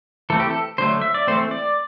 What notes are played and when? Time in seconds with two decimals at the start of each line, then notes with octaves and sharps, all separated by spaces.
0.30 E3 A3 C4 A4
0.40 G4
0.50 A4
0.78 D3 F#3 A3 C5
1.01 E5
1.14 D5
1.27 E3 A3 C4 C5
1.51 D5